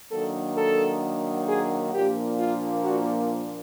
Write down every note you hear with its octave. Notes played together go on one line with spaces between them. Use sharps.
D#3 F#3 A#3 D4 A4
A4
G#4
A#2 F3 A#3 D4 G4
F4
F#4